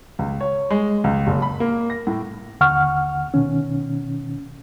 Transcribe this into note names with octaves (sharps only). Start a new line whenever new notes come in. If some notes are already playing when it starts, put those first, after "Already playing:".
C#2
C#5
G#3
C#2
F#1
B5
A#3
A#6
A2
D#2 D3 F#5 C#6 F6
B2 D#3 C#4